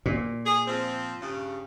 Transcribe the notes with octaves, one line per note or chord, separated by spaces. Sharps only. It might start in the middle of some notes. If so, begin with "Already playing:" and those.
A#2
G#4
F3 C4
G2 C#3